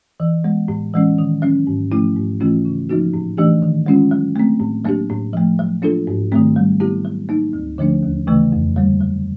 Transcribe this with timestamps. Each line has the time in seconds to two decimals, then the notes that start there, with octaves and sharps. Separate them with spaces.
0.20 E3
0.44 G#3 B3
0.68 A2
0.94 E3 G#3 C#4
1.18 D#3
1.42 F#3 A#3 C#4
1.67 G#2
1.92 F3 A3 C#4 E4
2.16 G#2
2.40 E3 A3 C#4 F4
2.65 C#3
2.90 F3 A#3 D#4 F#4
3.14 A2
3.38 E3 A3 D4 G4
3.62 D#3
3.86 G#3 C#4 F4
4.11 F#3
4.36 A3 C4
4.60 A2
4.84 F#3 A#3 D4 G4
5.10 A2
5.33 F3 A3
5.59 F#3
5.82 A#3 D4 F4 A4
6.07 G#2
6.32 D#3 F#3 A3 C4
6.56 G3
6.80 B3 E4 G4
7.05 F#3
7.29 A#3 D#4
7.53 D2
7.78 D3 F3 A3 D4
8.03 D#2
8.27 C#3 E3 A3
8.52 F2
8.76 D3 G3 A#3
9.01 F#3